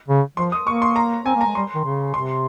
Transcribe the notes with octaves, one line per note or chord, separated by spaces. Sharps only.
C#3
F3 C6
D#6
A#3 C#6
C6
A#5
C4 G#5
A#3
A#5
G#3
G3 C6
D#3
C#3
C3 C6